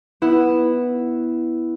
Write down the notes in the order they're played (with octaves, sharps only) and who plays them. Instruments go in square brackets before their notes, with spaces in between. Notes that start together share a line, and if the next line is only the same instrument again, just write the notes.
[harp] B3 E4